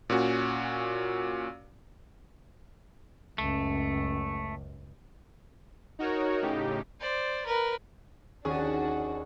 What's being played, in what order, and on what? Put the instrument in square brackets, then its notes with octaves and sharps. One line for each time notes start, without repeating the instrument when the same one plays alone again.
[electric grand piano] A#2 C#4 F#4
[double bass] C#2 F#2 [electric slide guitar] A3
[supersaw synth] D#4 F#4 A#4 C#5
A2 C#3 D#4 G4
[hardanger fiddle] C5 D5
A#4 B4
[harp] D#2 [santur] C#4 [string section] D4 F#4 [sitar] G#4